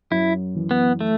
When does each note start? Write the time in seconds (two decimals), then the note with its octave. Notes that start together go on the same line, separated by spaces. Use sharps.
0.11 F#2 E4
0.55 E3
0.71 B3
1.01 A3